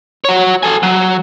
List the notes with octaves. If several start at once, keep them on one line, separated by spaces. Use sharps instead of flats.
F#4 C#5
A4 G#5
F#3